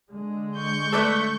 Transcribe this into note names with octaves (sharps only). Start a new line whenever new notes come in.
D3 G#3
C#6 G6
A3 A4 B4 D5